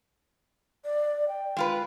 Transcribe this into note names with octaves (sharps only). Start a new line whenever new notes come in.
D5
G5
G#3 F4 B4